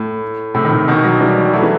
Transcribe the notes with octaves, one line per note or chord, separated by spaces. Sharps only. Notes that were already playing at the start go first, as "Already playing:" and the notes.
Already playing: A2
A2 C3
D#3
A2 C3
B2 D#3
D#3 F#3
E3 G3
G3
F#3 A3
E3